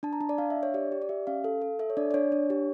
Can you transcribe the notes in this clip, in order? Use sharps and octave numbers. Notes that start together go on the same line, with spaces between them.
D4 A5
A#5
D4 A5
D5
D4 F5
E5
D4
C#5
G4 D5
G4
D5
G4 E5
C#4 F5
A4
A4
A4 E5
C#5
D4 D5
D5
D4 C#5
D4
G4